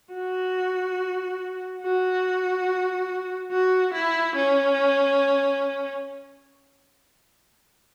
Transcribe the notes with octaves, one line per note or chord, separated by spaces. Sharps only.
F#4
F#4
F#4
E4
C#4